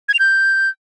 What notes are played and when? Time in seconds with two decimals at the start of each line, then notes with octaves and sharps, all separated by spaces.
0.09 G#6
0.14 F7
0.19 G6